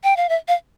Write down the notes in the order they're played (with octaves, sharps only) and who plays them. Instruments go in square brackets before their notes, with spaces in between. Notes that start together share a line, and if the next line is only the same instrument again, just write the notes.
[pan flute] G5
F5
E5
F5